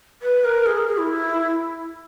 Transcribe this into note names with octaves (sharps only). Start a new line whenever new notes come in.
B4
A#4
G#4
A#4
G#4
E4